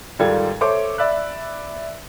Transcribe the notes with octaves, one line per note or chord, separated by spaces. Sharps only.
D#2 G#2 G3 F4 A4 G#6
A4 C5 C#5 E5 C6 D6
D5 E5 B5 E6 F#6